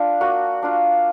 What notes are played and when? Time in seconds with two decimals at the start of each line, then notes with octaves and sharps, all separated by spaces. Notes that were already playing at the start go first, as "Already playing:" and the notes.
Already playing: D4 F4
0.21 A#3 F#4
0.63 D4 F4